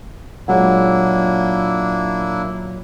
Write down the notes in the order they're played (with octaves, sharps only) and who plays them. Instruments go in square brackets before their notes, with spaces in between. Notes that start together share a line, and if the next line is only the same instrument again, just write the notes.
[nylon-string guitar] A#2 F#3 G#3 [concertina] A#3 D4 E4 [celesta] F#5